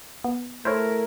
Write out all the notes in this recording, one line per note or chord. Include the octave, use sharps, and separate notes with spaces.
B3
A3 E4 A#4 C5 C#5